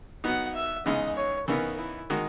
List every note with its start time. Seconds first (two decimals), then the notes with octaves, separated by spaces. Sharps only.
0.24 F#3 B3 D#4 F#5
0.55 E5
0.86 C#3 E3 G#3 B3 D#4 D#5
1.16 C#5
1.48 C#3 E3 B3 D#4 A#4
1.78 E4
2.10 D#3 G#3 D#4 F#4